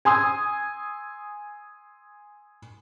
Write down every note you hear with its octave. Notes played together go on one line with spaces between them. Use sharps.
G#5 C6 D#6 E6 G#6